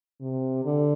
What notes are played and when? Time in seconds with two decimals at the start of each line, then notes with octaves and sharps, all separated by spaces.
0.21 C3
0.65 D3